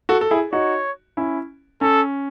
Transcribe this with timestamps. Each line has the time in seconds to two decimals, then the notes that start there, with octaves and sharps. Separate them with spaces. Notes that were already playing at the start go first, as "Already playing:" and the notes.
0.09 F#4 A4
0.21 A4
0.31 E4 G#4
0.53 D#4 F#4 C#5
1.17 C#4 E4
1.81 C#4 A4